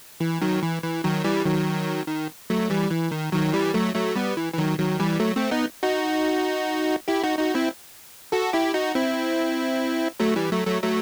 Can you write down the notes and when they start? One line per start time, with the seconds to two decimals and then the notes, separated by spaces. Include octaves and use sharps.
0.20 E3
0.42 D#3 F#3
0.63 E3
0.83 E3
1.04 D#3 F#3
1.24 E3 G3
1.45 D#3 F#3
2.08 D#3
2.50 F#3 A3
2.70 E3 G3
2.91 E3
3.11 D#3
3.32 D#3 F#3
3.53 E3 G3
3.74 F#3 A3
3.95 F#3 A3
4.16 G3 B3
4.37 E3
4.53 E3
4.58 D#3 F#3
4.79 D#3 F#3
5.00 E3 G3
5.20 F#3 A3
5.35 A3 C4
5.51 B3 D#4
5.83 D#4 F#4
7.08 E4 G4
7.24 D#4 F#4
7.39 D#4 F#4
7.55 C4 E4
8.32 F#4 A4
8.53 E4 G4
8.74 D#4 F#4
8.95 C4 E4
10.20 F#3 A3
10.36 E3 G3
10.52 F#3 A3
10.67 F#3 A3
10.82 F#3 A3